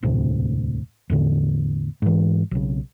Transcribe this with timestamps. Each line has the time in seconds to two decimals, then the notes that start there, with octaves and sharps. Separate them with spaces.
0.03 E1 D2 A2 C3
1.10 E2 A2 D3
2.02 G#2 E3
2.51 B1 C#3